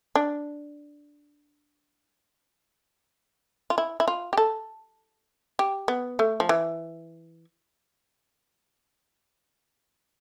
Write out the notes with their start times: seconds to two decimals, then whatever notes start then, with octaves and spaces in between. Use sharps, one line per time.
0.15 D4
3.70 F4
3.78 E4
4.00 E4
4.08 F4
4.33 G4
4.37 A4
5.59 G4
5.88 B3
6.19 A3
6.40 F3
6.49 E3